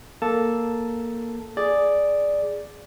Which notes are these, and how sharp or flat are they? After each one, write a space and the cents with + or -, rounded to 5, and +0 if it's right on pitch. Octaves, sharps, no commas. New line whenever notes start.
A#3 +0 A4 +0 A5 +0
G#4 +0 D5 +0